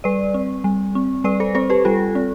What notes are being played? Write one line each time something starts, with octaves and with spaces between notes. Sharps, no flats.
G3 B4 D5
C4
G3
C4
G3 B4 D5
A4 C5
C4 A4 C5
G4 B4
G3 F4 A4
C4